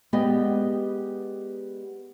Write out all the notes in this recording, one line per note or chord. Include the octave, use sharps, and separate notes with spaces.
G#3 B3 G4 D5 D#5 G5